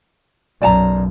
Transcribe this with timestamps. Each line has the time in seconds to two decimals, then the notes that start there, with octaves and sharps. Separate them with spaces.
0.62 B1 F#2 D5 A5 A#5